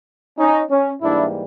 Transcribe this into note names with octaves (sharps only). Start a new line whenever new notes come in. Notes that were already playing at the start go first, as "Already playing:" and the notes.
C#4 D#4
C#4
G#2 E3 G3 A#3 D4 E4